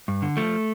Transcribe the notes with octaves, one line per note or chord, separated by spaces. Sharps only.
G2
D3
F3 A3